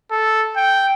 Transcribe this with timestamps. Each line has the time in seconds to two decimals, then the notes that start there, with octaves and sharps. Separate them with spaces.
0.11 A4
0.57 G5